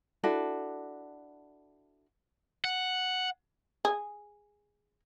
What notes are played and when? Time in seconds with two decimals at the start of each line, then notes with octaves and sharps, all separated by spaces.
0.23 D4 E4 F#4 A4
2.64 F#5
3.85 G#4